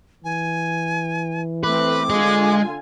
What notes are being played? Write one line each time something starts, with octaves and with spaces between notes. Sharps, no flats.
E3 G#5
A3 C4 B4 D6
D3 G#3 F4 G#4 G#5